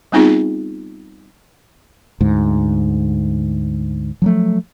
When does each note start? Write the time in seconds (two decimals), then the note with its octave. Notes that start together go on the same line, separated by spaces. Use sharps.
0.12 G3 B3 C4 D#4 F4 G#4
2.21 D2 G#2
4.22 F3 F#3 A3